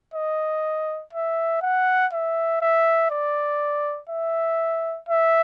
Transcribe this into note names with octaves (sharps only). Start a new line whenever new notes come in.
D#5
E5
F#5
E5
E5
D5
E5
E5